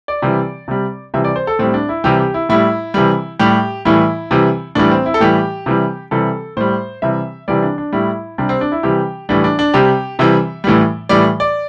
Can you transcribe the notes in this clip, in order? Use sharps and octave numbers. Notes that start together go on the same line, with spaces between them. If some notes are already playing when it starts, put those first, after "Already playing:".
D5
C3 E3 G3
C3 G3
C3 E3 G3 E5
D5
C5
A4
A2 G3 C4
D4
E4
C3 E3 G3 G4
G4
E4
A2 G3 E4
C3 E3 G3
A2 G3 G4
A2 E3 G3 E4
C3 E3 G3
A2 E3 G3 D4
C4
E4
A4
A2 E3 G3 G4
C3 E3 G3
C3 E3 G3 A4
A2 G3 C5
C3 E3 G3 E5
C3 E3 G3 D5
D4
D4
A2 G3 E4
C3 G3 D4
C4
D4
E4
C3 E3 G3 G4
A2 E3 G3 D4
D4
D4
C3 G3 G4
C3 E3 G3 E5
A2 E3 G3
A2 E3 G3 D5
D5